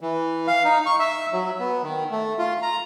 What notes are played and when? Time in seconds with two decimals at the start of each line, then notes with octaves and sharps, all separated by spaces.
0.01 E3
0.48 F5
0.65 D#4
0.86 C#6
0.99 E5
1.33 F#3
1.60 B3
1.83 D#3
2.11 A3
2.39 F4
2.62 A#5